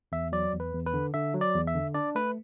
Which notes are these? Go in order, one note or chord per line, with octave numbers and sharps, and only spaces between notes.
E2 E5
F#3 D5
E2
B4
E2
B4
D3
D3 E5
F#3
D5
E2
E5
D3
D4 D5
A3 B4